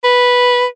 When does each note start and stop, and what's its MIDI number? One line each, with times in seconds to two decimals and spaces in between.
0.04 0.65 71